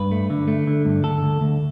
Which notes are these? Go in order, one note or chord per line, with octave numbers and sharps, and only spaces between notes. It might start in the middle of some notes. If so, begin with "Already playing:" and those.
Already playing: G2 B4
A3
D3
A3
D3
G2
D2 A4
D2
D2